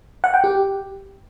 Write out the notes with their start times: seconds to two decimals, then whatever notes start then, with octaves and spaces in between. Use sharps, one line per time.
0.24 F#5
0.34 G5
0.44 G4